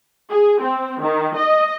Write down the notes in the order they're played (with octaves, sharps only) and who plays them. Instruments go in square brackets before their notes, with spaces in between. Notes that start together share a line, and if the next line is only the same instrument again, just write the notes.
[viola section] G#4
C4
D#3
D#5